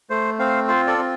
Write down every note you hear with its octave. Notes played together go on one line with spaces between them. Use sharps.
A3 C5
C4 C5 F5
F4 C5
A4 D5
C4